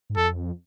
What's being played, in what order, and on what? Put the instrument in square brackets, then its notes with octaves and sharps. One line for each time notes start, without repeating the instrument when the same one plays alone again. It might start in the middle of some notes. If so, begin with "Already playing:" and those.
[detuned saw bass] G#2
[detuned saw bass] F2 [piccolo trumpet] A4